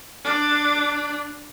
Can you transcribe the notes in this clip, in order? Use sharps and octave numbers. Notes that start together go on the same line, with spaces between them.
D4